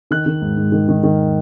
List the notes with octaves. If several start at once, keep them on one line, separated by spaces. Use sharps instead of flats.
D#3 F#6
D#3
G#2
G#2
D#3
D#3
D#3